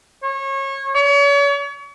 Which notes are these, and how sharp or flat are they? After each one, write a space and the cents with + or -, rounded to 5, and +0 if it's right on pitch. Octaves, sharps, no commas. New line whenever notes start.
C#5 -25
C#5 +40